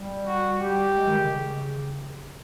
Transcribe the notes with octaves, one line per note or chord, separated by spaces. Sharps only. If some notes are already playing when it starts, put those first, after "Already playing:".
Already playing: G3
F#4
G3 G4
G#3
D#3
C#3